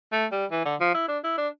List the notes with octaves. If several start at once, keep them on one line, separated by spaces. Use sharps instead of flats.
A3
G3
E3
D3
F3
E4
D4
E4
D4